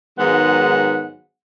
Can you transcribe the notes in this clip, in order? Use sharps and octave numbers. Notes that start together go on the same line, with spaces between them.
G#2 D#3 F#3 G#3 B3 F#5